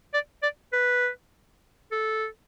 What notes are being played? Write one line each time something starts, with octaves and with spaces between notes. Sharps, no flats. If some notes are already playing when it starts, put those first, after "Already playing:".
D5
D5
B4
A4